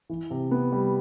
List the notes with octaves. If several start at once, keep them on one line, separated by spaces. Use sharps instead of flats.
E3
C3
B3
G3